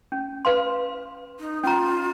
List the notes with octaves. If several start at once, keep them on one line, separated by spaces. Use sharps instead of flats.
C#4
B4 F5 C6
D#4
C#4 F4 A#5